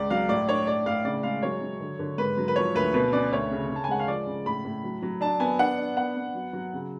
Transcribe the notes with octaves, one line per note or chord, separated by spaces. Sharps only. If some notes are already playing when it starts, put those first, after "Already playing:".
Already playing: C#2 D5
F#3 F5
A2 D5
D4 C#5
A2 D5
A2 F5
C#3 D5
G#3 F5
F#3 C#5
F#3
D3
D3
G#2 B4
F#3
B4
F3 C#5
D2 B4
B2 B4
C#4 D5
D2 C#5
C#3
C#3
A5
G#5
G#3 F#5
F5
F3 D5
C#3
A2 B5
A2
F#3
F#3
D4 A5
B3 G#5
D4 F#5
D4
B3 F#5
B3
F#3
F#3
C#3